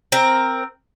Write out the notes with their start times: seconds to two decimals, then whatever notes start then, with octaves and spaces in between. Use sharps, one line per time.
0.12 C4 A#4